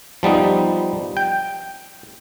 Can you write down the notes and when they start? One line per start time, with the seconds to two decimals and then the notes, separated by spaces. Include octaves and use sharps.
0.23 F3 G3 B3 D#4
1.17 G5